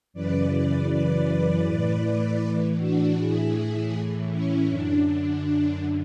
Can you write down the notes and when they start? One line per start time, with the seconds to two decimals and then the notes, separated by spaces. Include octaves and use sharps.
0.13 F#2 C#3 E3 B4 D5
0.52 B4 D5
0.89 B4 D5
1.65 A2 E3
2.78 D4 F#4
3.16 A2 E3 E4 G#4
4.30 C#4 E4
4.68 F#2 D3 D4
5.06 D4
5.43 D4